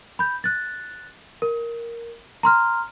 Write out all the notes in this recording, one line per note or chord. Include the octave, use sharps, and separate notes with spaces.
B5 G6
F#6 A6
A#4
A#5 C6 F6